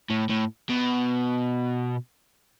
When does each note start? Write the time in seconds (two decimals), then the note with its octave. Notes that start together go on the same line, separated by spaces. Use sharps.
0.10 A2
0.29 A2
0.69 B2